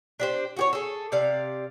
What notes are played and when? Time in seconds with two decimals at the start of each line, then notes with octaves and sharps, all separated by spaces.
0.20 D4 G4 C5
0.57 F#4 G4 C#5
0.73 G#4 A4
1.12 C3 D5 F5